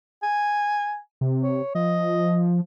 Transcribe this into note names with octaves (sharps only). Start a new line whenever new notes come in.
G#5
C3
C#5
F3 D#5